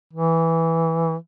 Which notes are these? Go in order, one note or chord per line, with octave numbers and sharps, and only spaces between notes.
E3